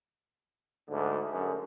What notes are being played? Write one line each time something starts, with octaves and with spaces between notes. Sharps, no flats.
D2 G#2 D3
F#2 D3 G#4